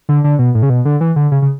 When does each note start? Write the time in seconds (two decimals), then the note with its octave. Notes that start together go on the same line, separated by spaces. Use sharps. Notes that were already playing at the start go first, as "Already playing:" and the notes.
0.09 D3
0.24 D3
0.39 B2
0.55 A2
0.63 C#3
0.70 B2
0.85 D3
1.01 E3
1.16 D3
1.31 C#3
1.42 C#3